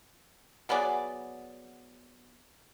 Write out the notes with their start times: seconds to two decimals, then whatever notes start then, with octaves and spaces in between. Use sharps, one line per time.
0.69 F#3 B3 G#4 D5